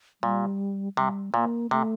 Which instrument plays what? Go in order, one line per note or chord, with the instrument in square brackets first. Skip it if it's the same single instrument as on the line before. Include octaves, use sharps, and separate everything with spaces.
[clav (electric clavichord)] A#2 [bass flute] G3
[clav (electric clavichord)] C3 [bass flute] G3
[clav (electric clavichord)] A#2 [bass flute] A#3
[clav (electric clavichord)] C3 [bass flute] A3